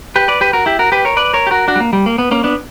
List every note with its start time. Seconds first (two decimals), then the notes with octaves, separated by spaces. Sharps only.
0.16 G4 B4
0.28 B4 D5
0.41 G4 B4
0.53 F#4 A#4
0.66 E4 G4
0.79 F#4 A#4
0.92 G4 B4
1.05 A#4 C#5
1.17 B4 D5
1.34 A#4 C#5
1.47 G4
1.51 F#4 A#4
1.68 D4 F#4
1.75 G3
1.80 A#3
1.93 G3
2.06 A#3
2.18 B3
2.31 A#3 C#4
2.44 B3 D4